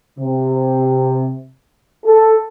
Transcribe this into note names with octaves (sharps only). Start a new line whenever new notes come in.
C3
A4